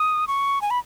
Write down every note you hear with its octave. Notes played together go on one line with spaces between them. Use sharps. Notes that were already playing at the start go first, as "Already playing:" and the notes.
Already playing: D#6
C#6
G#5
B5